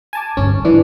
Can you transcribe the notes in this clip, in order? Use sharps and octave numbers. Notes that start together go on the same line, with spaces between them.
G#5 A5 D6
G2 D3 C#4
E3 D4